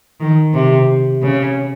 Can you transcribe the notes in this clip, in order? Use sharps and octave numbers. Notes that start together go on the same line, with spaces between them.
D#3
C3
C#3